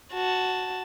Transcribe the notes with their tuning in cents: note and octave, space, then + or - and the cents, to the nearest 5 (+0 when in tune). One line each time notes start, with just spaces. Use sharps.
F#4 +0 A5 +0